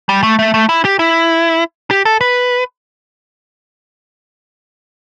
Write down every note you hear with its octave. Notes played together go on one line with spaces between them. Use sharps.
G3
A3
A3
A3
E4
G4
E4
G4
A4
B4